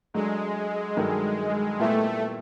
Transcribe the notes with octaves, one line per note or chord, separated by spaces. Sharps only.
F#3 G#3 A3 D4
G2 D#3 F#3 A3
A#2 G3 A3 B3 E4